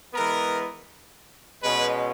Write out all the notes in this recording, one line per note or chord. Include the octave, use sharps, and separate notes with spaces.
E3 G#3 B3 A#4
B2 G#3 C#4 B4